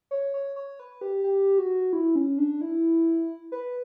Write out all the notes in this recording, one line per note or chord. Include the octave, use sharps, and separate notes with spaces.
C#5
C#5
C#5
B4
G4
G4
F#4
E4
C#4
D4
E4
B4